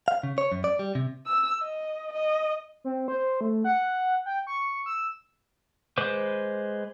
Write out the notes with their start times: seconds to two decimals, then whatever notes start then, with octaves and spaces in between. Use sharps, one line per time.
0.08 F5
0.23 C#3
0.38 C#5
0.52 F#2
0.64 D5
0.79 G3
0.95 C3
1.26 E6
1.62 D#5
2.13 D#5
2.84 C4
3.08 C5
3.41 A3
3.64 F#5
4.26 G5
4.47 C#6
4.86 E6
5.98 G#3 B4 C5 D6